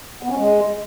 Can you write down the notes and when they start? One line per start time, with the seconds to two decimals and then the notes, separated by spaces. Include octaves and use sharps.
0.23 B3
0.30 C#4
0.37 G#3